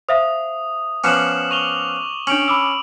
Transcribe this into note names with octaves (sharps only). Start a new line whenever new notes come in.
C5 E5 F5 D#6
F3 B3 C#4 D6 E7 F#7
C#6 F7 G7
C#4 D4 C#6 D7 F7 F#7
B5 D6 E6